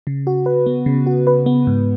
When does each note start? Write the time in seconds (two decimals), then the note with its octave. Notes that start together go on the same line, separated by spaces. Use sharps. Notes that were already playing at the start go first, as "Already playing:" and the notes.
0.07 C#3
0.27 F#4
0.46 B4
0.66 B3
0.86 C#3
1.07 F#4
1.27 B4
1.46 B3
1.67 G#2